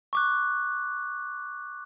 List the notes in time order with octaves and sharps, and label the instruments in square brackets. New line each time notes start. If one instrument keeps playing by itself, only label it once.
[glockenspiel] C#6 D6 F#6